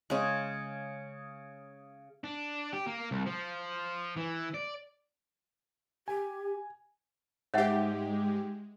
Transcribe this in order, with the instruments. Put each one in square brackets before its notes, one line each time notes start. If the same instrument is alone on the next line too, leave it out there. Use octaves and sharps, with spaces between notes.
[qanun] C#3 G#3
[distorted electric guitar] D4
G4
A#3
C2
F3
E3
D5
[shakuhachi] G4 [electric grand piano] G#5
[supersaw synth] G#2 G4 [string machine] G#3 [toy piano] C#5 E5 F#5